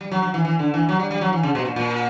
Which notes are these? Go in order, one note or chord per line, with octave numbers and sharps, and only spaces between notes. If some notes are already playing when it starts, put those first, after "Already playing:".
G3
F#3
F#3
E3
E3
D3
E3
F#3
G3
G3
F#3
E3
C#3
B2
A#2
A#2